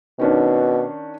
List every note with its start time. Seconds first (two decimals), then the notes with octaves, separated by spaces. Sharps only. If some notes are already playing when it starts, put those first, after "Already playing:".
0.19 B2 D#3 C#4 D4